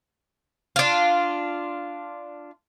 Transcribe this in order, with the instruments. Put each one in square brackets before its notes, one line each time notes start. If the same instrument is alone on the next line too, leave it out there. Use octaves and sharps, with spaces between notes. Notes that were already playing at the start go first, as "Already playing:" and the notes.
[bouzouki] D4 F4